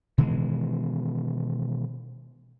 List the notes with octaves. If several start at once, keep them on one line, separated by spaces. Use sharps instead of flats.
B2 D#3 E3 G#3